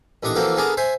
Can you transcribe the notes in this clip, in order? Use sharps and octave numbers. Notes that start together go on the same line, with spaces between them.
A1 D#2 D4 C#6 D#6
E3 F3 A#3 C4 F#4 A4
D3 B3 G#4 A#4 A5 D6
C5 E5 G#5